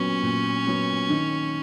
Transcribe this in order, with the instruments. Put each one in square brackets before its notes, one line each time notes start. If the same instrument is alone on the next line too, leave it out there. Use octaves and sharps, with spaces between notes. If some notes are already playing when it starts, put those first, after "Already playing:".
Already playing: [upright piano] A#2 F#3 B3 [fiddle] C#4
[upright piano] A#2
F#3 B3
D#3